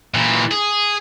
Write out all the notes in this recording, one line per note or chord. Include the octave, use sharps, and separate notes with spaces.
A#2 E3
G#4